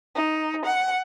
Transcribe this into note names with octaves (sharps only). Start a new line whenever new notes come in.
D#4
F#5